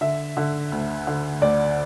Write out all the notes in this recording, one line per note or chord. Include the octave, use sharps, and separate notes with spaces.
D3 E5
D3
D2
D3
D2 D5